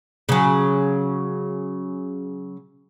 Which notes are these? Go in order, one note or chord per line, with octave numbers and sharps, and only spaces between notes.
C#3 F#3